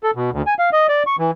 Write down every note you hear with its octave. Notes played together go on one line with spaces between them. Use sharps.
A4
B2
D2
G#5
F5
D#5
D5
C#6
E3